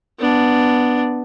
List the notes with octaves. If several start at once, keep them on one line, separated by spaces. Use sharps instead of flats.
B3 D4